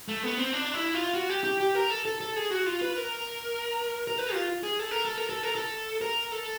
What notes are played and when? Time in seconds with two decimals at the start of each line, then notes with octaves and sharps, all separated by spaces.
0.08 A3
0.23 B3
0.38 C4
0.53 D4
0.74 E4
0.94 F4
1.14 F#4
1.29 G4
1.44 G4
1.60 G4
1.75 A#4
1.90 A4
2.05 A4
2.20 A4
2.36 G#4
2.51 F#4
2.66 F4
2.81 B4
2.96 A#4
4.07 A#4
4.18 B4
4.33 F4
4.63 G#4
4.79 A4
4.91 A#4
5.05 A4
5.18 A#4
5.29 A4
5.43 A#4
5.55 A4
6.01 A#4
6.32 A4